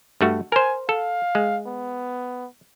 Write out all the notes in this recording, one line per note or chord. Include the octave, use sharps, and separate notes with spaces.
G2 A3 F#4
A#4 C5 G#5
A4 F5
G#3
B3